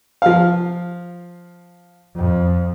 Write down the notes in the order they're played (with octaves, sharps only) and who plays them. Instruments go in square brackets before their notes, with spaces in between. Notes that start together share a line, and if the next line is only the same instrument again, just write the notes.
[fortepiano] F3 F5
[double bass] F2